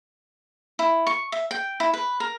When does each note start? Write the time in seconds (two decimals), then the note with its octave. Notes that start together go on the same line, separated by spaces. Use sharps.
0.79 E4
1.07 C#6
1.32 E5
1.51 G5
1.80 E4
1.94 B4
2.20 A#4